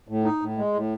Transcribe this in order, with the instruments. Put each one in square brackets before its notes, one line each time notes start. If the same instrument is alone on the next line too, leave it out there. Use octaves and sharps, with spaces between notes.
[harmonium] A2
D#4
A2
G#3
A2